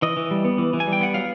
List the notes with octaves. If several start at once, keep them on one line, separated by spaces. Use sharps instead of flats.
E3 D#5
E3
G3
B3
E3
E3
G#5
G3
G5
B3 F#5
F#3 F5